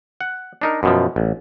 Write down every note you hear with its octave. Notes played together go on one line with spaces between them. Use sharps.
F#5
D4 D#4 A#4
F#2 B2 F3
A1